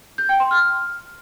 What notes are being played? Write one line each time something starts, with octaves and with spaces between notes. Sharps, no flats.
G6
G5
C6
F6